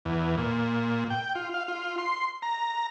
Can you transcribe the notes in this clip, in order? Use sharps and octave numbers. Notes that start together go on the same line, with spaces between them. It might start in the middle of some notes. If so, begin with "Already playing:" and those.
E2
A#2
G5
F4
F5
F4
C6
A#5